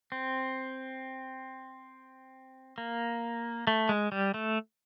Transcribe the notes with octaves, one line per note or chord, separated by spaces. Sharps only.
C4
A#3
A3
G#3
G3
A3